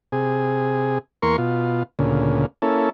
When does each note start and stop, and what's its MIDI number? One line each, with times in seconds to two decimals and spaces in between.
0.12 0.98 48
0.12 0.98 68
1.22 1.37 40
1.22 1.37 58
1.22 1.37 70
1.22 1.37 84
1.22 1.37 85
1.38 1.83 47
1.38 1.83 65
1.99 2.46 38
1.99 2.46 46
1.99 2.46 49
2.62 2.90 58
2.62 2.90 61
2.62 2.90 64
2.62 2.90 69